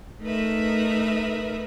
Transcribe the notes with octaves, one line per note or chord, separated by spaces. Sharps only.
A3 D#4 A#4 B4 E5